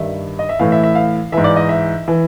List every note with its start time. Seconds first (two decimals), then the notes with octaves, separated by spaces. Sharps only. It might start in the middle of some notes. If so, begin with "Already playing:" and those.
Already playing: G2 D#3 E5
0.39 D#5
0.49 E5
0.59 A2 E3 F5
0.72 E5
0.83 E5
0.95 F5
1.32 G#2 E3 E5
1.44 D5
1.56 D#5
1.69 E5
2.08 E3